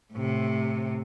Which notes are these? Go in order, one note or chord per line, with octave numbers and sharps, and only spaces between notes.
A2 C3